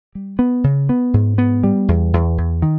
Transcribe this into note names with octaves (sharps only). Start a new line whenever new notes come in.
G3
B3
C#3
B3
G#2
B3
G3
E2
E2
E2
D#3